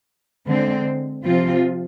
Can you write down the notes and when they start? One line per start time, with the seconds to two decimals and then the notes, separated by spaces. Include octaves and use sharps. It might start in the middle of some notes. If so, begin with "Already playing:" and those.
0.48 D3 G#3 C4
1.24 C3 F3 C4 F4